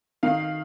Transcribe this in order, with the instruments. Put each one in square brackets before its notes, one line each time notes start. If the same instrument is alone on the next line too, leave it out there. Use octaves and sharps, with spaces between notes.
[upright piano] D#3 F5